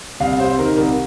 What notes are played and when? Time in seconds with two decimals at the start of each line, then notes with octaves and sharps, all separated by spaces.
0.20 C2 F5
0.40 C3 C5
0.59 D#3 A#4
0.77 C2 A#4